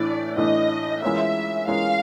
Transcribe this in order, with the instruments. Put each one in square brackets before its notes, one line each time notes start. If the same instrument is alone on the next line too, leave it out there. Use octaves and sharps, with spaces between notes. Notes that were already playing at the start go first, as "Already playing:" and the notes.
Already playing: [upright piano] A2 E3 A3 D4 [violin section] D5
[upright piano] A2 E3 A3 D4 [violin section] D#5
[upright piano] E3 G#3 C#4 F4 A#4 [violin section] E5
[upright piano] E3 G#3 C#4 F4 A#4 [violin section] F5